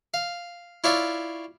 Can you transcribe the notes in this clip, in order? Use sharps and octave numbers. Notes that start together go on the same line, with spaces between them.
F5
E4 F4 C#5 D5 E5 F5